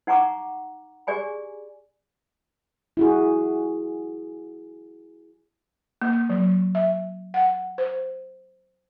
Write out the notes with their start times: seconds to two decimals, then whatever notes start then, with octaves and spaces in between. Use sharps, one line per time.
0.07 D#4 F#5 G#5 A#5 C#6 D6
1.07 G4 G#4 D5 G#5 B5
2.97 E4 F#4 G#4
6.02 A#3
6.30 F#3
6.75 E5
7.34 F#5
7.78 C5